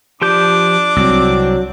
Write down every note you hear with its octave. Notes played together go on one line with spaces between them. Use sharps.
F3 D4 G4 D6 G6
C2 F#3 C4